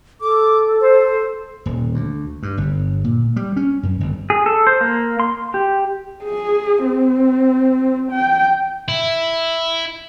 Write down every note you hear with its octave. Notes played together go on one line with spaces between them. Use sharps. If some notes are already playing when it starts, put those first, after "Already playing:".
A4 D6
C5
D#1
D2
G2
G1
A#2
G3
C#4
F#2
G1
G#4
A4
C5
A#3
C6
G4
G#4
C4
G5
E4